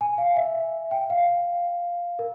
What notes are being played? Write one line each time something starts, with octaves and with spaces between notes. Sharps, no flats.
G#5
F5
E5
G5
F5
A#4